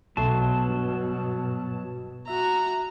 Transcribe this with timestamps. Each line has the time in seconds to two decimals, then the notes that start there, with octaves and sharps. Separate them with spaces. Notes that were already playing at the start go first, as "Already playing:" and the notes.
0.17 B1 B2 F#3 A3 A5 C6
0.68 G2
2.28 F#4 E5 A#5